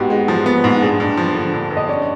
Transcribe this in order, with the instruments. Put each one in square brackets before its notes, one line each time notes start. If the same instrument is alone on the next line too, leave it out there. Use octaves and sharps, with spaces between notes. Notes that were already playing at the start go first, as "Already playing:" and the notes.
Already playing: [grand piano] G#2 B3 [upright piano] F#4 G4
[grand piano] G#3
[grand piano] F3 [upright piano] G#4
[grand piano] B3
G#2
[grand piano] G2 [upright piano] G#4
[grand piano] G2
F3
D3
G2
G2
[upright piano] D#5
[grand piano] C#4 [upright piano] D5